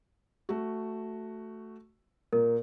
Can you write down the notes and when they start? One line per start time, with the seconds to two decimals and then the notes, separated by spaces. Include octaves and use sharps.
0.49 A3 F#4
2.33 A#2 A#4